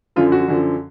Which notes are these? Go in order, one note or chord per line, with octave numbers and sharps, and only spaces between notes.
F#2 D3 F3 F4
F#4
F#2 D3 F3